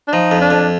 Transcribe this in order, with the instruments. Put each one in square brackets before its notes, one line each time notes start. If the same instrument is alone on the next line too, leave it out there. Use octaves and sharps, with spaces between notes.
[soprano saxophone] D4
[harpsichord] F3 [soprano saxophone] D#4
[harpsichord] F2
[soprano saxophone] D4
[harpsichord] F2